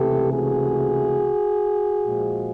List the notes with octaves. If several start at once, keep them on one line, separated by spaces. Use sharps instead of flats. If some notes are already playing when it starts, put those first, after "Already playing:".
Already playing: C#2 C3 E3 A3 G4 A4
F#4 G#4
A#2 F3 G#3